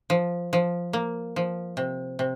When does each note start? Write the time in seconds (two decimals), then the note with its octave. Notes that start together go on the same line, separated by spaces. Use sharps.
0.10 F3
0.53 F3
0.93 A#3
1.36 F3
1.77 C3
2.19 C3